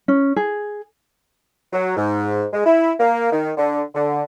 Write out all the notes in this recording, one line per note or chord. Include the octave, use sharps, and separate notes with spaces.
C#4
G#4
F#3
G#2
G#3
E4
A#3
D#3
D3
D3